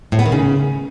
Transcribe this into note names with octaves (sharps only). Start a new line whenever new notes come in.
A2
B3
D#3
C#3